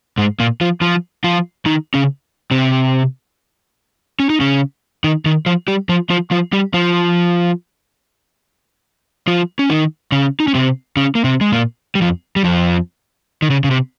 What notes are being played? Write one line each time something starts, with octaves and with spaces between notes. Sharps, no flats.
G#2 G#3
A#2 A#3
F3 F4
F3 F4
F3 F4
D#3 D#4
C#3 C#4
C3 C4
C#4
D#4
C#3 C#4
D#3 D#4
D#3 D#4
F3 F4
G3 G4
F3 F4
F3 F4
F3 F4
G3 G4
F3 F4
F3 F4
C#4
D#3 D#4
C#3 C#4
D#4
C#4
C3 C4
C#3 C#4
A#3
C3 C4
G#3
A#2 A#3
G3
F2 F3
G3
F2 F3
D#3
C#3
C#3
C3